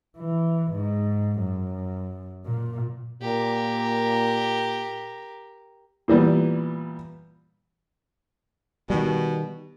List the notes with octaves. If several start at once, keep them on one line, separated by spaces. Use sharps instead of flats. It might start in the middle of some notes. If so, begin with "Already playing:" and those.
E3
G#2
F#2
A#2
A#2 G4 A#4
A#2 E3 G3 B3
B2 D#3 G3